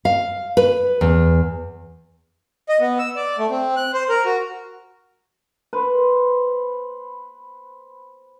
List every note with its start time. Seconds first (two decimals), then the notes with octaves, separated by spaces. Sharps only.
0.05 F5
0.57 B4
1.01 E2
2.69 D#5
2.80 B3
2.99 E6
3.16 D5
3.38 A3
3.50 C4
3.76 F#6
3.93 C5
4.09 A#4
4.25 F#4
5.73 B4 C5